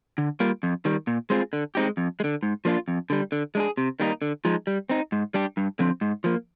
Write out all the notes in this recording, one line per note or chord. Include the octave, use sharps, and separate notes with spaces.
D3
G3 A#3 F4
F2
D#3 G3
A#2
G#3 C4 F4 G#4
D3
G#3 C4 D#4 G4
F2
G#3
D3
G#2
F3 A#3 D4 F4
F2
D3 G3
D3
G#3 D4 G#4
C3
D#3 G3 A#3 D#4
D3
F3 G#3 D#4
G3
C4 D#4
G#2
G3 D4 G4
G2
D3 F3 C4
G#2
F3 A#3